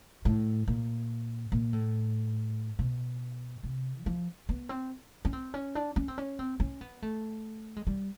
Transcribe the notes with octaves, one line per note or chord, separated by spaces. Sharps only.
A2
A#2
A#2
A2
B2
C3
F#3
F3
B3
C4
C#4
C4
C#4
D4
C#4
C4
C#4
C4
C#4
B3
A3
G#3
G3